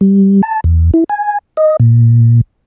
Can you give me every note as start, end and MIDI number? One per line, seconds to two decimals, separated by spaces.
0.01 0.42 55
0.43 0.60 81
0.64 0.91 40
0.94 1.04 64
1.09 1.38 80
1.57 1.77 75
1.80 2.41 46